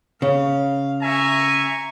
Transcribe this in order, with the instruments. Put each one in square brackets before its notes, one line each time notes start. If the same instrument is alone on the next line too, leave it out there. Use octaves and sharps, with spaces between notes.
[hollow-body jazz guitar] C#3 [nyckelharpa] F5
[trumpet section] E5 G#5 [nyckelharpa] A#5 C#6